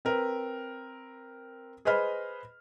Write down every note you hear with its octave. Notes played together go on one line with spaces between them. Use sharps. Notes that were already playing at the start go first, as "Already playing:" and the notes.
C4 A#4 B4
G#4 B4 C5 D#5 B5 F6